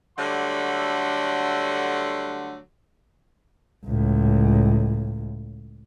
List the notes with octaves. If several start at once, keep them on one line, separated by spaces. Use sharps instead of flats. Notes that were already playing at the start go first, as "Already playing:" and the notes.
D3 F#3 G3 A3 F#5 C6
C#2 A2